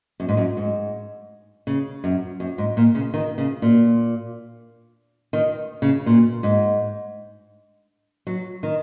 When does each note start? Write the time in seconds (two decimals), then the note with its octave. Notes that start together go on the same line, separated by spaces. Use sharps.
0.20 F#2
0.29 G#2
0.37 F#2
0.57 G#2
1.67 C#3
2.04 F#2
2.40 F#2
2.58 G#2
2.77 A#2
2.95 C#3
3.14 D#3
3.38 C#3
3.62 A#2
5.33 D#3
5.82 C#3
6.06 A#2
6.43 G#2
8.27 F#3
8.63 D#3